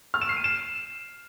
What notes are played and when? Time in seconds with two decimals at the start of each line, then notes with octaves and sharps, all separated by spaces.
0.14 F6
0.21 E7
0.29 C7
0.37 D#7
0.44 E7